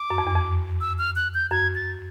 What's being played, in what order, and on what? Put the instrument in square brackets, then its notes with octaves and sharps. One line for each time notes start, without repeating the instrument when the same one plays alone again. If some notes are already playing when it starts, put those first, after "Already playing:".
Already playing: [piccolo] D6
[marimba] F#2
F2
E2
F2
[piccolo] E6
F6
F#6
G6
[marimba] F#2 [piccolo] G#6
[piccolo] A6